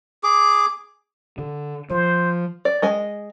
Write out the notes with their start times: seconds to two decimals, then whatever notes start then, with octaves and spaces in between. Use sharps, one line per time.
0.24 G#4 D6
1.38 D3
1.91 F3 C5
2.65 D5
2.82 G#3 D#5 G#5